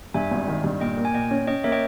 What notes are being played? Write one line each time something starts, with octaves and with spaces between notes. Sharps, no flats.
G2 E5 G#5
G#1
D#3
G2
A#2 D#5 G5
A#3
G#5
A#2 D#5 G5
C#4
C#4 D#5 G5
A#3 C#5 E5
D#5 G5